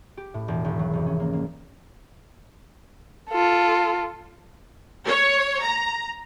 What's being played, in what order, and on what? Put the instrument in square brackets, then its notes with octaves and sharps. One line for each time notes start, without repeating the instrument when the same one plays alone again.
[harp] G4
A2
E1
G#1
F#3
F1
C#4
A#3
A#3
[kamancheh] F4 A4
[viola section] C#5
A#5